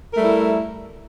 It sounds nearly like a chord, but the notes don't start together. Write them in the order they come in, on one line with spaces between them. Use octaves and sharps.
A#4 A3 G3 E4